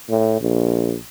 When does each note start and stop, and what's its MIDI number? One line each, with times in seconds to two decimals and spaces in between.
0.10 0.41 45
0.42 0.96 34